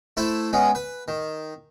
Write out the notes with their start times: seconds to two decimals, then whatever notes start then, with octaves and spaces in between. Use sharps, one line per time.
0.17 A3 E4 C5 A5 B5
0.53 G#3 B3 C#4
0.75 B4
1.08 D#3